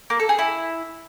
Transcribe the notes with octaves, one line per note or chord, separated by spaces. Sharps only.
A#3
A4
G#4
E4